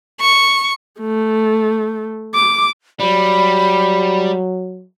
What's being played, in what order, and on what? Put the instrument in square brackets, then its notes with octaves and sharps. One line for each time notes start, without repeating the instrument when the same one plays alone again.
[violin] C#6
[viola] A3
D6
[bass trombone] F#3 [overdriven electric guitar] G3 [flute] B5